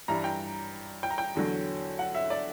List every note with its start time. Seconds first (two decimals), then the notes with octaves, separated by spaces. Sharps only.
0.08 G2 E3 G3 A#5
0.24 G5
1.03 G5
1.11 A#5
1.18 G5
1.35 E2 D3 F#3
1.99 F#5
2.15 E5
2.30 D5